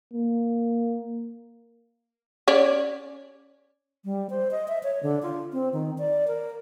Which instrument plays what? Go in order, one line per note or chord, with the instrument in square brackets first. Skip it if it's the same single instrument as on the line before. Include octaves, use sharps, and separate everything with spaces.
[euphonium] A#3
[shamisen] C#4 C#5 D5
[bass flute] G3
C5
D#5
E5
C#5
D3
F4
C4
D#3
D5
A#4